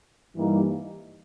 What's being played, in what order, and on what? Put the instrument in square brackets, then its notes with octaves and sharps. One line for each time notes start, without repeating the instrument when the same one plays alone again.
[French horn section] G2 E3 G3 A#3 D#4